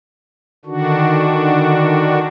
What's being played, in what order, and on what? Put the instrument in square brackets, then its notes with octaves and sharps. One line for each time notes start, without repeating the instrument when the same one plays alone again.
[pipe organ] D3 D#3 D4 F#4